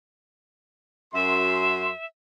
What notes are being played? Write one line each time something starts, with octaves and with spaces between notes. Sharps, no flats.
F#2 E5 C6